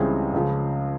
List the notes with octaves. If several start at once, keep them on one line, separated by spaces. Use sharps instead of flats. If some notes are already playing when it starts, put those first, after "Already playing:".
Already playing: C#2 C#3 E3 G3 C4 G#4
C#2 C#3 F3